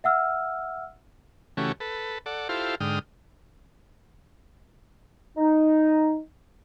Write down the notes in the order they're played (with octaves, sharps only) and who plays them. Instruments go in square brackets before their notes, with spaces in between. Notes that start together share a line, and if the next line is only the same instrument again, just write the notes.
[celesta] E5 F#5 E6 F6
[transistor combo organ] C#3 E3 A3 C#4 F#4 G4
A4 B4
A4 D5 F#5
E4 F4 G4 A4 C5 F5
G#2 D3 G5 D#6 F6
[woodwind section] D#4